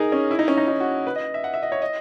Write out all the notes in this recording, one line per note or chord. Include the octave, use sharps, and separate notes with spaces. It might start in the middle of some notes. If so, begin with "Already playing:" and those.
Already playing: D#4 G#4 A#4
C#4
E4
D#4
C#4
D#4
D#4
F#4
B4
D#5
E5
F#5
E5
D#5
C#5
D#5